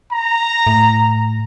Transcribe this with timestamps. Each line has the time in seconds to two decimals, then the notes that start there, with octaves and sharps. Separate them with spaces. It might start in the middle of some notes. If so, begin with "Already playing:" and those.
0.12 A#5
0.67 A2